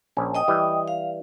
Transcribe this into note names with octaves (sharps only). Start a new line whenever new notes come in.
A#1 C#4
D#5 G5 D#6
E3 G3
F5